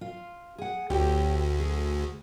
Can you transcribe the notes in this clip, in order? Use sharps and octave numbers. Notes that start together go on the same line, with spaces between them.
F4 F5
G#4 F#5
D2 G4 C#5 G5
G#4